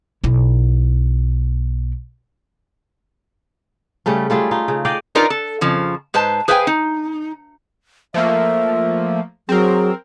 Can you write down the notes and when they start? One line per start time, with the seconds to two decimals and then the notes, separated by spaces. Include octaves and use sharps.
0.24 B1 E4
4.06 C#3 G3 A3 C#4
4.30 G3 A3 F4 G#4
4.51 D#4 F4
4.68 C#3
4.85 D5 D#5 F5 G5
5.15 D4 D#4 F4 A#4 B4 D5
5.30 A4
5.61 F2 C#3 F3
6.14 G#2 B4 C5 A5
6.48 G#4 B4 C5 F5 G5 G#5
6.67 D#4
8.14 F3 A3 A#3 E5
9.49 F#3 C4 G#4 A#4